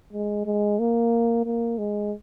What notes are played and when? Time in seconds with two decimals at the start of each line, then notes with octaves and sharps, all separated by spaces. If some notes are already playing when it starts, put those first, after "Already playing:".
0.13 G#3
0.46 G#3
0.79 A#3
1.45 A#3
1.78 G#3